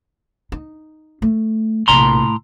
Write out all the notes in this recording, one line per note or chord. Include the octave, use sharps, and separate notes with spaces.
D#4
A3
A#1 A2 C3 A#5 C6